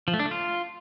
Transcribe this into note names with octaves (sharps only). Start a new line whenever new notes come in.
F3
A3
D4
A3
F4